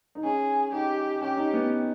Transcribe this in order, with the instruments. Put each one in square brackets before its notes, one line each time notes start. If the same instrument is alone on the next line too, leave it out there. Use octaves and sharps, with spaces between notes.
[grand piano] D#4
[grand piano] C#4 [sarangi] G#4
[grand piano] D#4 [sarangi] G4
[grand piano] C#4 [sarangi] G4
[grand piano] D#4
B3